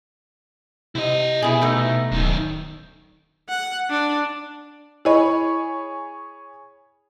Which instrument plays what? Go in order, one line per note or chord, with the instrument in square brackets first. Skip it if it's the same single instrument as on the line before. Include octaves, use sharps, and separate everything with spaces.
[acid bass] C3 [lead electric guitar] E4 D#5
[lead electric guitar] B2 [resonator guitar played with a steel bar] E4 G#4
[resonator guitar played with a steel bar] A3 D#4
[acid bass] D1 [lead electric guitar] F#2 D#3
[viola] F#5
D4
[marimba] E4 D#5 [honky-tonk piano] G#4 C#5 B5